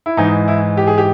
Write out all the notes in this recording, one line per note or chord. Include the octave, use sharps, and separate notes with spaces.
E4
G#2 E3 D#4
E4
G4
G#4
G4